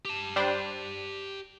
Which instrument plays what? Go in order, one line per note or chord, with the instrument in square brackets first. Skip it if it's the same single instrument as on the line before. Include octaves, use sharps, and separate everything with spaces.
[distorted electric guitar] G4 A5
[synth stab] G3 D4 C5